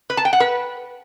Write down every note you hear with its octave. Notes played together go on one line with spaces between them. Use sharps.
B4
A5
G5
F#5
B4